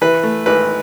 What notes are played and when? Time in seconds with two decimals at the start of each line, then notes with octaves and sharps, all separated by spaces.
0.01 E3 B4
0.23 A3
0.46 G#1 B4